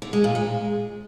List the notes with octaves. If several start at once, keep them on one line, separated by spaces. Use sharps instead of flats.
D3
G#3
A#2
G#3